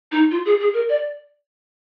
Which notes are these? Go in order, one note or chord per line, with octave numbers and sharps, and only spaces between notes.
D#4
F4
G#4
G#4
A#4
D5